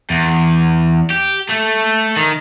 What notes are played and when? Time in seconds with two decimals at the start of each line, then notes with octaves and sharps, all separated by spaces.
0.10 E2
1.10 G4
1.50 A3
2.17 D#3